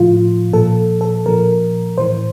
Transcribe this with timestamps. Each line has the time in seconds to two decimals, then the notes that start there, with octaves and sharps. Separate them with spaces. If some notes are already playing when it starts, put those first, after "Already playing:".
Already playing: A2 F3 F4
0.53 A#2 F3 A4
1.01 A4
1.26 A#2 F3 A#4
1.98 A2 E3 C5